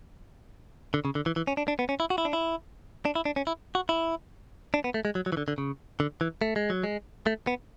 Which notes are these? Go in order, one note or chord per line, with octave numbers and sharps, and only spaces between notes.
D3
C#3
D3
E3
E3
C#4
D4
D4
B3
C#4
E4
F#4
E4
D4
E4
D4
E4
D4
C#4
E4
F#4
E4
D4
B3
A3
G#3
F#3
F#3
E3
D3
D3
C#3
D3
E3
A3
G#3
F#3
G#3
A3
B3